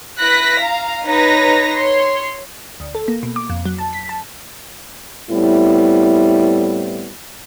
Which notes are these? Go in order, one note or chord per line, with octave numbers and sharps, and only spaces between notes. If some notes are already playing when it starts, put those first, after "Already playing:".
E4 B4 F#6 A#6 B6
F5 A#5
D#4 B4 C#5 A#5 A#6
C#5 C6
D2
A4
A#3
B2
D6
F2
F#3
A5
B6
A5
A2 G3 B3 C4 E4